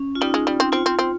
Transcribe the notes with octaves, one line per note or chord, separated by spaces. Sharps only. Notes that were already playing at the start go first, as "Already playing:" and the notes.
Already playing: C#4
F4
G3 D#4
G#3
G3
C4
C4 F4
C4
C4